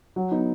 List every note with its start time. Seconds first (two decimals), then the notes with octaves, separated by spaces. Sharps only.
0.16 F#3
0.31 B3 D#4